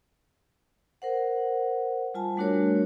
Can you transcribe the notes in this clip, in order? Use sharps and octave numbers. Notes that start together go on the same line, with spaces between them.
A#4 C5 F#5
G3 F4 G#5 A5
G3 A3 D4 F#4 A#4 C#5